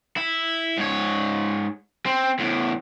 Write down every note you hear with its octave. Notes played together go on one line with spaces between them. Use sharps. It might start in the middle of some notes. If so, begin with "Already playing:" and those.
E4
G#2 C#5
C4
E2 A2